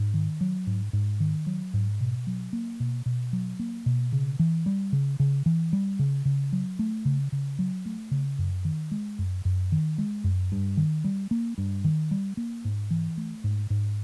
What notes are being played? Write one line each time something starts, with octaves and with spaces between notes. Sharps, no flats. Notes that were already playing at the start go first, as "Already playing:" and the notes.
Already playing: G#2
D#3
F#3
G#2
G#2
D#3
F#3
G#2
B2
F#3
A#3
B2
B2
F#3
A#3
B2
C#3
E3
G3
C#3
C#3
E3
G3
C#3
C#3
F#3
A3
C#3
C#3
F#3
A3
C#3
F#2
D#3
G#3
F#2
F#2
D#3
G#3
F#2
G2
D#3
G3
A#3
G2
D#3
G3
A#3
G#2
E3
A3
G#2
G#2